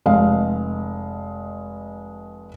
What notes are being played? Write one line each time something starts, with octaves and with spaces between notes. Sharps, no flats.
F1 G#3 F5